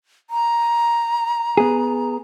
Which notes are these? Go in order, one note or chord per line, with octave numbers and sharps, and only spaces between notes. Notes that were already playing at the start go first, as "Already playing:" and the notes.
A#5
B3 G#4